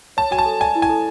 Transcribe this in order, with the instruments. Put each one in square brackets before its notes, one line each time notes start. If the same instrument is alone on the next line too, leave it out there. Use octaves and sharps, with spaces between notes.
[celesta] C#5 [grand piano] A5
[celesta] F#4 [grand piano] G#5
[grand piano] A5
[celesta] A4
[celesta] D5 [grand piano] G#5
[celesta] E4
[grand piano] G#5
[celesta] A4